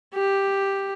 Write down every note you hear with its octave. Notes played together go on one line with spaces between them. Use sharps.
G4